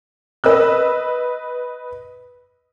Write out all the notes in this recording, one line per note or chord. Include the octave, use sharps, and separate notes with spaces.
B4 D#5 E6 F#6